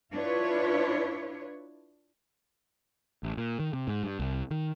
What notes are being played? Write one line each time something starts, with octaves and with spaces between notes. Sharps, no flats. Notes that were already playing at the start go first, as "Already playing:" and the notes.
D4 E4 F4 B4 C#5
A1
A#2
D#3
C3
G#2
G2
C2
D#3